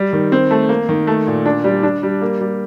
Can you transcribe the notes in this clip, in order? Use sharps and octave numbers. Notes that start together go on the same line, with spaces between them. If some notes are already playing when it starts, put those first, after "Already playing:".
Already playing: G3
D#3
C4
A3
A#3
D#3
A3
A#2
D4
G3
D4
G3
A#3
G3